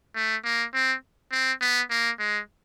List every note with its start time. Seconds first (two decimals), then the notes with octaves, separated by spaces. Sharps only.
0.16 A3
0.44 A#3
0.74 C4
1.32 C4
1.61 B3
1.90 A#3
2.19 G#3